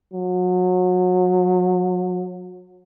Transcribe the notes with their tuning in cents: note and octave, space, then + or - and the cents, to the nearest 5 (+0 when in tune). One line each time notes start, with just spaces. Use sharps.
F#3 -30